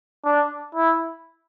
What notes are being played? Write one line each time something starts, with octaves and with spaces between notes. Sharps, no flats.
D4
E4